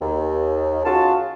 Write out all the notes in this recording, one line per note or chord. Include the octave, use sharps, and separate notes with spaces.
D#2
C#3 F4 F#4 A5